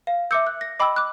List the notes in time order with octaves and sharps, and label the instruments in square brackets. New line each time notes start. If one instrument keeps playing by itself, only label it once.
[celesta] F5
[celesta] E5 D6 E6 [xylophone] G6 C#7
[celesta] F#6
A#6
[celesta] D#5 E6 [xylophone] G5 B5 D6
[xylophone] D6 F#6